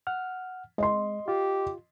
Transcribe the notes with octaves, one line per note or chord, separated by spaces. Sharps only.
F#5 F6
G#3 D#5 C6
F4 G4